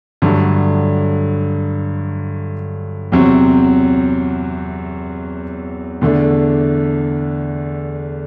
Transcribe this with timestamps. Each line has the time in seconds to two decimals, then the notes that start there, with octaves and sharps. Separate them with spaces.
0.22 G2 D3 F#3 A3
3.12 E2 C3 F#3 C4
6.01 E2 D3 A3 D4